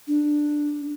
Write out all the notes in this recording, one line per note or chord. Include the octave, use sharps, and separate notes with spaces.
D4